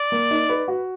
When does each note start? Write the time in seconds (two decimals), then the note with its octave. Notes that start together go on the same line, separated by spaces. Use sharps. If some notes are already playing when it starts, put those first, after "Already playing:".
Already playing: D5
0.12 A#3
0.31 D#4
0.49 B4
0.68 F#4